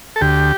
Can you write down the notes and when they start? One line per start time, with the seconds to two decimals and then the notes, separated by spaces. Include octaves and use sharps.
0.16 A4
0.21 D2 G4